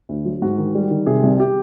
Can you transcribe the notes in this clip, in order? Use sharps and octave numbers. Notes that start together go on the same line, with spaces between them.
D2
F#3
G#2 F#4
D#3
G3
D#3
C3 G#4
C2
G4